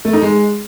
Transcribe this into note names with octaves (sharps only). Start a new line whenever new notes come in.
A3
D#4
G#3